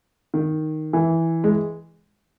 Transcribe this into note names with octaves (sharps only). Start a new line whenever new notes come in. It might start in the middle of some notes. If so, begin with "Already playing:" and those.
D#3
E3
G#3